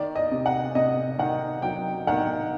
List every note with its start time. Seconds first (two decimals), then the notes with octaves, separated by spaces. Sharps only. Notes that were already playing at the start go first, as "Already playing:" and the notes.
Already playing: D#3 D5
0.16 D#5
0.31 C3
0.46 F#5
0.75 C3 D#5
1.19 D#3 F#5
1.62 F#3 G5
2.07 D#3 F#5